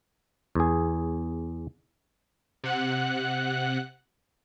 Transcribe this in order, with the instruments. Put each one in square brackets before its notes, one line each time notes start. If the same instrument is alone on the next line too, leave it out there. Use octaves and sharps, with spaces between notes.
[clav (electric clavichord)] E2 G#4
[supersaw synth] C3 F#5 F#6